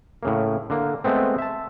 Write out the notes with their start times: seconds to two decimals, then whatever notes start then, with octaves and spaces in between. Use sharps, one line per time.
0.23 A2 C#3 A#3
0.70 D3 A#3
1.04 G#3 A3 B3 C4
1.38 E5 A5